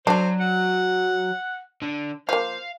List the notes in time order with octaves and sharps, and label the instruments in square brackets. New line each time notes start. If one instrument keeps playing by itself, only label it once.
[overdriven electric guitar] F#3 [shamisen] D4 A4 [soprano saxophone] C5
[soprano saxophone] F#5
[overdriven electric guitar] D3
[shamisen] F3 A#3 [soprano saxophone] C5 [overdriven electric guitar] F5